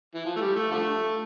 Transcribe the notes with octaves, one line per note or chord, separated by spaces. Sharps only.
E3
F3
A3
G3
A3
D3 F3 A3